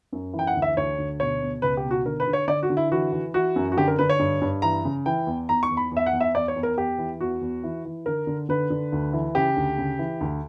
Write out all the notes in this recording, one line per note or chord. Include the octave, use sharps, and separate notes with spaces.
F#2
E3
G5
F#5
D2
E5
D2 C#5
D2
B2 C#5
B2
C#2 B4
G4
B2
F#4
D3 A#4
B4
D3
C#5
D3 D5
F#4
D3
E4
E3 F#4
E3
E3 F#4
F#2
F#4
D3 G4
A#4
D3 B4
C#5
G2
G2
E3 A#5
C#3
E3 G5
E2
E2 A#5
C#6
E2
B5
E2
E5
F#5
E2
E5
E2 D5
C#5
E2
A#4
E2 G4
E3
E2 F#4
E2
E3
E3
D3 A#4
D3
D3 B4
D3
D2
E3
C#3 G4
D2
C#3
E3
D2